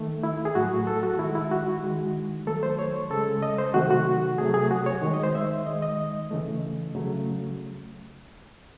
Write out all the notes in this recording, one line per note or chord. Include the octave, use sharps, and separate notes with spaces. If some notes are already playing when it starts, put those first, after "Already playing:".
Already playing: D#3 A3
E4
G#4
A2 F#3 A3 F#4
A4
F#4
D#3 G#3 E4
E4
F#4
D#3 G#3
D#3 F#3 A3 A4
C5
C#5
C#3 G#3 A4
D#5
C5
C3 D#3 F#3 A3 F#4
F#4
C3 F#3 A3 G#4
G#4
F#4
C#5
D#3 G#3
D#5
C5
E5
D#3 G#3 D#5
D#5
C#3 E3 A3
C#3 F#3 A3